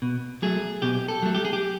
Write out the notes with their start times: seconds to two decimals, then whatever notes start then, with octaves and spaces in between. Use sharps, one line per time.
0.02 B2
0.42 F#3 A3 G#4
0.82 B2 G4
1.08 A4
1.22 F#3 A3
1.35 G4
1.45 G#4
1.53 G4